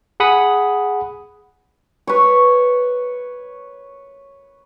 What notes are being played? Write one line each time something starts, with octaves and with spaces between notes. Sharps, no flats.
G#4 F#5 B5 D#6
B4 C#5